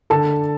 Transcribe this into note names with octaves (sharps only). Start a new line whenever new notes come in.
D3 A4 A5